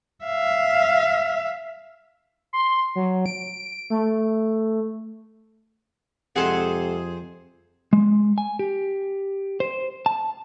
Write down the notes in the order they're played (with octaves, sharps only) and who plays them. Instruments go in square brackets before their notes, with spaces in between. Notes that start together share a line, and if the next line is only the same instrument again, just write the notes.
[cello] E5 F5
[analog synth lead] C6
F#3
D7
A3
[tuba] F2 [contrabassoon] C3 [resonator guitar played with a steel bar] G#3 A4 F#5 [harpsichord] G#4 C5
[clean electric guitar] G#3
G#5
G4
C5
A5